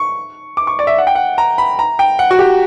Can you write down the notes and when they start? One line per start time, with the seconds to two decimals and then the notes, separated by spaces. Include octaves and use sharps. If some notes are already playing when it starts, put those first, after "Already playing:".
Already playing: C#6
0.57 D6
0.67 C#6
0.79 D5
0.87 E5
0.98 F#5
1.07 G5
1.15 F#5
1.38 A#5
1.58 B5
1.79 A#5
1.99 G5
2.19 F#5
2.31 F#4
2.39 G4